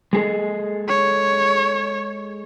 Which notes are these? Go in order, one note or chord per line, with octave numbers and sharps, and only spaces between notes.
G#3 G#4 A4
C#5